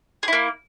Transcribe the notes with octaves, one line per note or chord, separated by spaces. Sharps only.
A#3 E4 G#4